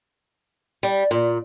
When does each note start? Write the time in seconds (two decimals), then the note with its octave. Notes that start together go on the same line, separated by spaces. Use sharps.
0.83 G3
1.11 A#2